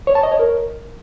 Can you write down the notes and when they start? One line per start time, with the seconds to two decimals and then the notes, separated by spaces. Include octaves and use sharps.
0.07 C#5
0.15 A5
0.23 D#5
0.31 C#5
0.39 A#4